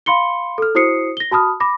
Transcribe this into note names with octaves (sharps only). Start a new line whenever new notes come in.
F5 B5 C6 C#7 G7
A4 F6
E4 F#4 C5 D#6 C7 C#7
A#6 G7
F#4 A5 B5 D#6 F6
B5 D6 A#6